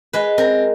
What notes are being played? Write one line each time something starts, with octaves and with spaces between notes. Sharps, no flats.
G#3 B4
C4 A#4